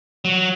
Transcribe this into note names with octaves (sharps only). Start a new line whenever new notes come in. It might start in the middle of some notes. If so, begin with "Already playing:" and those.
F#3